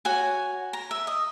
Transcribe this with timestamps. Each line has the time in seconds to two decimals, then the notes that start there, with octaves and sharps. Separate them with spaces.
0.05 F#4 C#5 G#5
0.73 A#5
0.91 E5
1.07 D#5